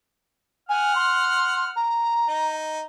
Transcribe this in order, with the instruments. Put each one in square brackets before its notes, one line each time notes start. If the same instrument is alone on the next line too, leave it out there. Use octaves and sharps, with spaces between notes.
[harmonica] F#5 F6 [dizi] G#5
[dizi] C6
A#5
[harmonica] D#4